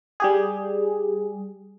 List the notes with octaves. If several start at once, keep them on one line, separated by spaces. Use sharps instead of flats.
G3 G4 G#4